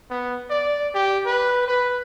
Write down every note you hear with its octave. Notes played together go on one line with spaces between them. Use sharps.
B3
D5
G4
B4
B4